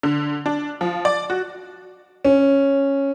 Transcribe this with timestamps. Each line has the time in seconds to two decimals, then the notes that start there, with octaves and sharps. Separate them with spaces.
0.03 D3
0.46 D4
0.81 F3
1.05 D5
1.30 F#4
2.25 C#4